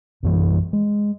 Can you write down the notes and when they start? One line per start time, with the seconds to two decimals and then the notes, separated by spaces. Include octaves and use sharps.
0.23 A#1 F#2 E3
0.73 G#3